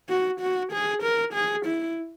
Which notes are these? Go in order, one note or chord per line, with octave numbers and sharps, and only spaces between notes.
F#4
F#4
G#4
A#4
G#4
E4